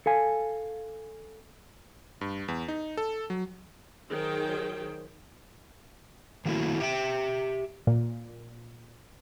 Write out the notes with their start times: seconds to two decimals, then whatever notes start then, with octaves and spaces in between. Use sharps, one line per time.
0.06 A4 F5 G#5
2.21 G2
2.48 E2
2.68 D#4
2.97 A4
3.30 F#3
4.09 D#3 F#3 G#4 C5 G5
6.45 D#3 F#3 A3 A#3 E4 F#4
6.80 G4 E5 G5
7.87 A#2